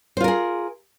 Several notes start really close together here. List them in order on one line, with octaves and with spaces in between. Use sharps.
C5 F4 A#4 G#4